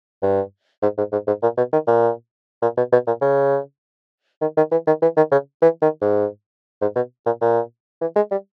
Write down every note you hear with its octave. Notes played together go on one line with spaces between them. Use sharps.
G2
G#2
G#2
G#2
G#2
A#2
B2
D#3
A#2
A#2
B2
B2
A#2
C#3
D#3
D#3
E3
D#3
E3
D#3
C#3
E3
D#3
G#2
G#2
B2
A#2
A#2
E3
G#3
G3